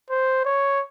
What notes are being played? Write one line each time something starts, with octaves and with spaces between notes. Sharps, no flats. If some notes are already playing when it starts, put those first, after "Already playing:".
C5
C#5